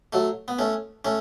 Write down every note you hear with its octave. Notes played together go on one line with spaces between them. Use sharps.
F#3 A3
B3
A3 C#4
A3 C#4